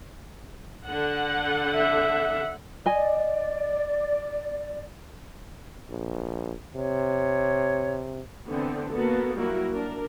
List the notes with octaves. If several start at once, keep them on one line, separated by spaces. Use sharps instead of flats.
D3 F#5
E5
D5 D#5 G#5
A#1
C3 C#5
D3 E3 B3 C4 D4
A#3 B3 F#4 A4
F#3 G3 A#3 E4 F#4 A#4
D4 A#4